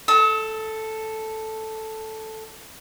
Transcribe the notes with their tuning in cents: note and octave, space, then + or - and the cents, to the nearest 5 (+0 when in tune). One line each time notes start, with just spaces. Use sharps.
A4 +0 E6 -45